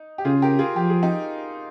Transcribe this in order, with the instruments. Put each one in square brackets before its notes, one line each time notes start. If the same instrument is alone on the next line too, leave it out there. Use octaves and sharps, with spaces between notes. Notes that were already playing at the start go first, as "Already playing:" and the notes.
Already playing: [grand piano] D#4
G4
[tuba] C#3 [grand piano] F4 G#4
[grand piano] G4 A#4
F4 G#4
[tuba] F3 [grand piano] G4
[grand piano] G#4
D#4 G4